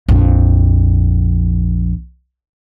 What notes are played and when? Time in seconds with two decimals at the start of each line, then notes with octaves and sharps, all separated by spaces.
0.09 A#1 F2